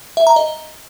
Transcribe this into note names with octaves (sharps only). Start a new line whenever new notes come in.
E5
A#5
D#5